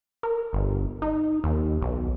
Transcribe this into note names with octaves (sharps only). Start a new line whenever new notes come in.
A#4
G1
D#4
D#2
B1